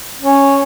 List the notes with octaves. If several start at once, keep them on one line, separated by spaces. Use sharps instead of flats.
C#4